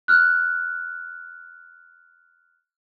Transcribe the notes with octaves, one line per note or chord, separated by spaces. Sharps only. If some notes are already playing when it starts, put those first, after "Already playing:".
F6 F#6